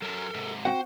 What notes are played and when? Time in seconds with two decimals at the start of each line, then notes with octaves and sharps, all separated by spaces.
0.02 F#2 F#3 A4 A#4
0.34 G#2 C3
0.65 C4 F#4 C5 F#5 G5